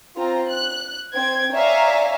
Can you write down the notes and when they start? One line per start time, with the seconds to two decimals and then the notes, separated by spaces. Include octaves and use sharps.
0.15 C4 F4 A#5
0.50 F#6
1.13 C4 G5 G#6
1.53 C#5 D5 E5 F5 G#5 A#5